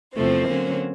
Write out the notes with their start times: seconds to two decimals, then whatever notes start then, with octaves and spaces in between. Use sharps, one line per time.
0.16 E2 C3 F3 A3 C4 C5
0.47 D3 F#3 A#3 C#4